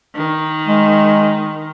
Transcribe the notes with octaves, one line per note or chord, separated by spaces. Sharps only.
D#3
G#3